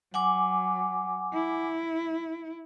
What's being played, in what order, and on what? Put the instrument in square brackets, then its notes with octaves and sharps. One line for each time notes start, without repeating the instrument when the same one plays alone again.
[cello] F#3 [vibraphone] F#5 G#5 D6
[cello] E4